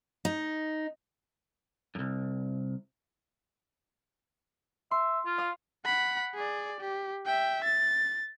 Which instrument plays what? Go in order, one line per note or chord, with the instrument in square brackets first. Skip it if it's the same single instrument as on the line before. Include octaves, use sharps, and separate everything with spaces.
[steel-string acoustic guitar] D#4
[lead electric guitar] C2 F#2
[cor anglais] E5 [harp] C6
[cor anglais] F4
[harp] F5 D#6
[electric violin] F#5 B5
G#4 D5
G4
E5 G5
A6